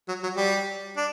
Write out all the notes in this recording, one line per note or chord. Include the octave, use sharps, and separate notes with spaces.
F#3
F#3
G3
D4